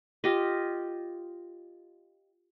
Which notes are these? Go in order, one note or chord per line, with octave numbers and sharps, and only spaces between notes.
F4 G4 D#5